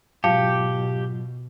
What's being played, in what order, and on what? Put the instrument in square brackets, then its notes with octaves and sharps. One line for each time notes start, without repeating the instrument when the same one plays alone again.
[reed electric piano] G#2 F#3 F4 [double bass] B2 [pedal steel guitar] G4 [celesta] F5 A5 C#7